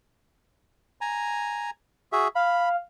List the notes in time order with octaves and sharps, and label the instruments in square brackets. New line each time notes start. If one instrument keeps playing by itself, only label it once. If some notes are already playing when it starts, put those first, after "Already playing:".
[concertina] G#5 A#5
F#4 G#4 E5
[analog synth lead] F5 [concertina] B5